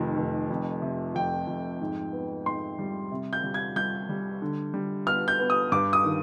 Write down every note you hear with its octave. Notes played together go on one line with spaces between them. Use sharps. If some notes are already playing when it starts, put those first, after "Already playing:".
Already playing: F1 F2 D#3
F1
F2
C3
F2 G5
F2
G#2
B3
G#2 C6
G3
C3
G6
G3
G#6
G3 G6
G3
D3
G3
B3 F6
G6
B3
D#6
G2 D6
D#6
D#3